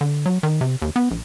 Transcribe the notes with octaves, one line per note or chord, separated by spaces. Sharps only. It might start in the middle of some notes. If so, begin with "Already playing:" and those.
D3
F#3
D#3
C3
D#2
B3
A#1